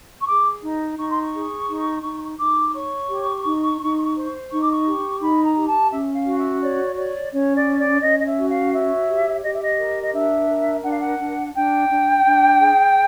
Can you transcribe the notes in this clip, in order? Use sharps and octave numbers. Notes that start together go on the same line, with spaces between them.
C#6
G#4 D6
D#4
D#4 C#6
C6
C#6
G#4
D#4
D#4
D#4 D6
C#5 C#6
G4
D#4
D#4
C5
D#4 C#6
D6
C#6
G4
D#4 B5
A#5
G4
A5
C#4 E5
F5
F#4
E5
C#5 D5
C#5 D5
C#4 C#5
D5
C#5
D5
C#4 D#5
D#5
E5
F#4
F5
C#5 E5
G4
G4 D#5
E5
D#5
A#4
D#5
D4 E5
A#4
D4 F#5
F5
F#5
D4
D4 G5
D4
D4
G#4